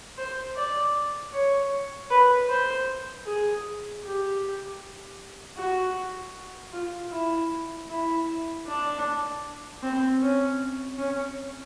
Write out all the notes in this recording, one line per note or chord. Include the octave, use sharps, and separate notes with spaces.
C5
D5
C#5
B4
C5
G#4
G4
F#4
F4
E4
E4
D4
C4
C#4
C#4